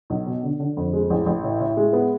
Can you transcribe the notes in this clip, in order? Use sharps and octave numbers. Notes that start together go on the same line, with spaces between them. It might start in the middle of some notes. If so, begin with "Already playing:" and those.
B1
B2
D3
D3
F2
G#3
A1
A1
A2
A2
G#3
B3